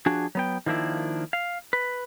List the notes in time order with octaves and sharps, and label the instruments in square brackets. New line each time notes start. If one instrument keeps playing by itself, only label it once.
[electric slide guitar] F3 D4 F#4 G#4
F#3 B3 G5
D#3 F3 A#3 D4 E4
F5
B4